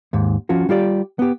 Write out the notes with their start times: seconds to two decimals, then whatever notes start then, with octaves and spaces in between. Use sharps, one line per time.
0.13 D#2 G#2
0.49 F3 C#4 F4 F#4
0.69 G3 F4 G4 D5
1.19 B3 G4